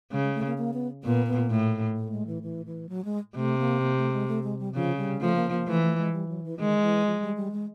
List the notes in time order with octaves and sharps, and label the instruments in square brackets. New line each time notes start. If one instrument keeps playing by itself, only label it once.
[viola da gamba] C#3 [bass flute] G#3
[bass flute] G#3
A3
A#3
A#3
B3
[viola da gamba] A#2 [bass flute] B3
[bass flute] B3
[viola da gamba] A2 [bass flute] A3
[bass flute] A3
G#3
E3
E3
E3
F#3
G#3
[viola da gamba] C3 [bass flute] A3
[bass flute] A#3
A#3
A3
G#3
A3
G#3
G3
[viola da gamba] C#3 [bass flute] F3
[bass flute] G3
[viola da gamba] F3 [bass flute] A3
[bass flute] A#3
A#3
[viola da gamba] E3 [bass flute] A3
[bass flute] A3
G#3
G3
F#3
E3
[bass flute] D#3 [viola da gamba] G#3
[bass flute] E3
F3
G3
G3
G#3